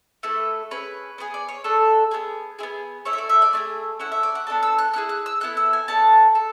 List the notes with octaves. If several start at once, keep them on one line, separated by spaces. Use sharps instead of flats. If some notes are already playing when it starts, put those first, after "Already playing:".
A3 E4 A4 B4
C#4 G#4 B4
B3 E4 G#4
D5
C#5
A3 D4 A4
B3 D4 G#4
B3 E4 G#4
A3 E4 A4 C#5
E5
D5
E5
D5
A3 D4 G#4
C#4 E4 A4 F#5
E5
D5
F#5
B3 D4 A4 A5
E6
F#6
B3 E4 G#4 F#6
F#6
E6
B3 E4 A4 F#6
E6
G#5
B3 D4 A4 A5
A4